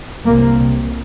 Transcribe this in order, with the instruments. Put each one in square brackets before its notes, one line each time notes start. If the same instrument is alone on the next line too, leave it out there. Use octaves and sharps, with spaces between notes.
[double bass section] C2 C3 A#3